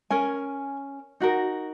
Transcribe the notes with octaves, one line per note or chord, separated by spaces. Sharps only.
C#4 A#4 G#5
D#4 F#4 A#4